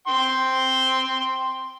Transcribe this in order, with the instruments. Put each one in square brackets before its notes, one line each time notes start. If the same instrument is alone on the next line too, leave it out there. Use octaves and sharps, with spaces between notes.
[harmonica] G5 C6